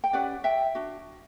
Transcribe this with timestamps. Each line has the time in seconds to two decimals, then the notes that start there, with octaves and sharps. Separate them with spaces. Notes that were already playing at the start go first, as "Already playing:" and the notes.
0.04 G5
0.13 C#4 G4 B4 D5 F#5
0.44 E5 G5
0.75 D4 F#4